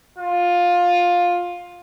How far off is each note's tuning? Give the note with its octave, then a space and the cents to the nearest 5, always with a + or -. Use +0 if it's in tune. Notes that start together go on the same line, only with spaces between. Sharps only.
F4 +15